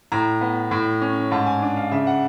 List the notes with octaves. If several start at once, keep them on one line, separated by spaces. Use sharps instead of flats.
A2 A#5
B3
A2
C#4
G#2 A5
G#5
D4
F5
C#3 E5
F#5